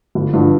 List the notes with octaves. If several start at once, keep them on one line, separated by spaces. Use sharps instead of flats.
G1
G2 D3 F3